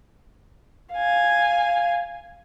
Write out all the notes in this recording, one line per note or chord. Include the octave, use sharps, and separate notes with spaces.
F5 G#5